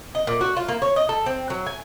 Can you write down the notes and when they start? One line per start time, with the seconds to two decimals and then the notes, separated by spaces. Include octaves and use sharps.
0.15 D#5
0.27 A#2
0.41 F#4
0.57 F4
0.69 A#3
0.82 C#5
0.96 D#5
1.09 A4
1.26 C4
1.50 F#3
1.66 G#5